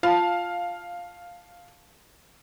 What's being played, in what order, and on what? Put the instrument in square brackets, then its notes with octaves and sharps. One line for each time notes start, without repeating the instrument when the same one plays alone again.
[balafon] F4 [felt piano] F5 [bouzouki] A5